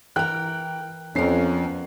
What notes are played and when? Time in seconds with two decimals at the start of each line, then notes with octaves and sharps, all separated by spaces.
0.16 E3 A#4 G5 F#6
1.15 F2 F3 B3 C#4 A#4 C7